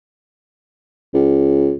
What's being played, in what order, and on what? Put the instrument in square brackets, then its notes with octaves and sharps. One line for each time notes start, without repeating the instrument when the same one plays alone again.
[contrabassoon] C#2